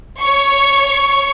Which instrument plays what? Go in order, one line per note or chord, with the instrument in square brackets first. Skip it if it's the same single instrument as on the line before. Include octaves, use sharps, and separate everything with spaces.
[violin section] C#5 C#6